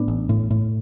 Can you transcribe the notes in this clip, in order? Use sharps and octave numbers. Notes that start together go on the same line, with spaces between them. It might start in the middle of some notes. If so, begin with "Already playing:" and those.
Already playing: A2 B3 D4
A1
A2
A2